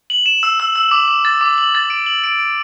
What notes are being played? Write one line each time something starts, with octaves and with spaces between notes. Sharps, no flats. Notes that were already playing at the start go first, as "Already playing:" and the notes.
F#7
E7
E6
E6
E6
D6
D6
A6
D6
F#7
A6
D7
F#7
D7
D7